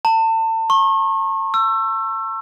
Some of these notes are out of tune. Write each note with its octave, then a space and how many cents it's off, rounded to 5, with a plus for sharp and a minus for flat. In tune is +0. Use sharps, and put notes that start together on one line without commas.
A5 +35
C#6 -35
E6 +25